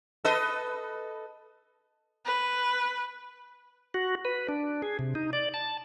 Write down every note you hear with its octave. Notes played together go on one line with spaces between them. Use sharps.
A4 B4 D#5
B4
F#4
B4
D4
G#4
C3
D#4
D5
A5